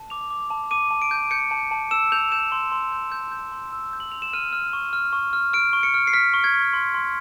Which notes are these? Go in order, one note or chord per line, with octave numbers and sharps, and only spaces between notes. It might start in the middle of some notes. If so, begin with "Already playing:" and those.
Already playing: A5
D6 F7
D6
A5
D6 D#7
A5
D7
G6
G6 C#7
A5
A5
E6 E7
G6 F7
G6 E7
C6
C6
G6
G6
G6
C6
E6
G6
F#7
C6 F7
E7
F6 D#7
F6
C#6
F6
C#6
F6
F6 D7
C#6
C#7
F6
C7
F6 B6
C#6
G#6
C#6
C6
C6